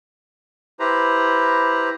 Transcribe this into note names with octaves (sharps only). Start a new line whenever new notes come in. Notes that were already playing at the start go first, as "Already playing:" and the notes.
E4 G4 B4 C5 A#5